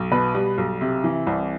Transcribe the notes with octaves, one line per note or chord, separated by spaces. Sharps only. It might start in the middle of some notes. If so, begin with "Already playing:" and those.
Already playing: B1
B2 B4
G3
B1
C3
E3
C2